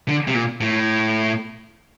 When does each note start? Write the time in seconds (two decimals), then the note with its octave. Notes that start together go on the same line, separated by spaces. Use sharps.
0.08 D3
0.28 C3
0.34 A#2
0.61 A2